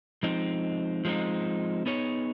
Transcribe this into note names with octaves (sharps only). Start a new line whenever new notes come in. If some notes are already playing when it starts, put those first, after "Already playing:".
F3 G#3 C4 D#4
F3 G#3 C4 D#4
B3 D#4 G#4 C#5